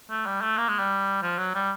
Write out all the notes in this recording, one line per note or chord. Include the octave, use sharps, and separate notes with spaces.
A3
G3
A3
A#3
G#3
G3
F3
F#3
G3